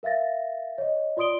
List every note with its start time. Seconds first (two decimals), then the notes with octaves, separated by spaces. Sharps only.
0.03 A#4 E5 F5 A6 A#6
0.78 C#5 D#5
1.17 F4 D5 C6 D#6 D7 G7